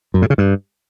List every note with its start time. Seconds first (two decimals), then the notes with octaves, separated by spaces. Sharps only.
0.14 F#2
0.22 A2
0.30 C#3
0.38 G2